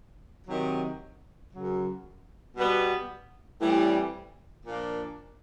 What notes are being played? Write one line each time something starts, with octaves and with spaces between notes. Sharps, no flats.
C3 D#3 F#3
F#2 C#3 F#3
B2 G3 B3
A2 E3 G3 C4
A#2 F3 A#3 D4